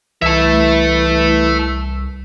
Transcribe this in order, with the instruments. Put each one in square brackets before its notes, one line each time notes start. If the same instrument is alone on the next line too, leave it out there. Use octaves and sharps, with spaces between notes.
[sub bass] C2 [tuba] E3 [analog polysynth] E4 [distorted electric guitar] E5 A5